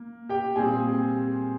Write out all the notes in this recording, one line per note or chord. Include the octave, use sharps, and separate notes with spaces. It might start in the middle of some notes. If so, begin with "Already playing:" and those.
Already playing: A#3
G4 G5
A#2 G3 C4 G#4 G#5